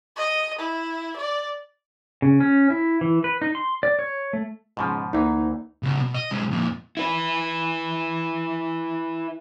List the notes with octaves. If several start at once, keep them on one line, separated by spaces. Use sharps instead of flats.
D#5
E4
D5
C#3
C#4
E4
E3
B4
D#4
C6
D5
C#5
A3
C#2 G#2 B2 F3
D2 E3 A#3 D#4
C#3 B3
B2
D#5
B1 G#3
F2 A#2
E4 B4